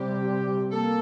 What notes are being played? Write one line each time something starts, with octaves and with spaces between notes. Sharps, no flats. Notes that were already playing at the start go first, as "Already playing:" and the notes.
Already playing: C3 G3 C4 G4
A#3 A4